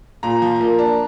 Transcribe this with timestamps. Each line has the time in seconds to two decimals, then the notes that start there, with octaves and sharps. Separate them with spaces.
0.23 A#2 A#5
0.42 F3
0.61 A#3
0.79 D4